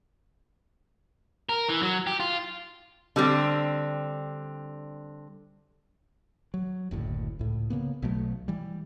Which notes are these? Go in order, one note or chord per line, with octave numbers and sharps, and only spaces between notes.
A#4
E3
F#3
G4
F4
D3 G3 C4
F#3
F#1 D2 A2
C#2 A2
C#3 A#3 B3
B1 B2 F#3 A3
E3 G3